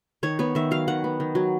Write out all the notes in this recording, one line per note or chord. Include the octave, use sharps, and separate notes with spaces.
D#3 C#5
B3 C#5
D#3 E5
F#3 F5
D#3 F#5
B3
D#3
F#3